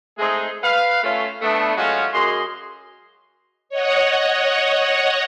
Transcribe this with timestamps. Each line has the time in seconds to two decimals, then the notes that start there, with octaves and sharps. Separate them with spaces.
0.19 G#3 A3 C4 D#4 G#4
0.63 B4 F5
1.04 A3 C#4 F4
1.42 A3 B3 D4
1.77 F#3 G#3 A3 C#4 F4 F#4
2.13 F#2 G#4 D#5 C6
3.69 C#5 D#5 F#5